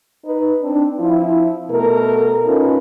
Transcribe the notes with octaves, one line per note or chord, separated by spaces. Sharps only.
D#4 B4
C4 D4
F3 C4 E4
B2 A3 A4 A#4
C#4 D#4 F4 A4 B4